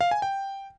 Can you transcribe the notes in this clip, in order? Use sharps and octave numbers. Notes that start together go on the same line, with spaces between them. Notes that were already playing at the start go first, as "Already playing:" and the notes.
F5
G#5
G5